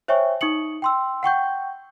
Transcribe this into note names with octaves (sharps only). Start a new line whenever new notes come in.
C5 C#5 E5 G5 G#5 C#6
D#4 C#6 D#6 C#7 F#7
G5 C6 E6
F#5 G5 C#6 G6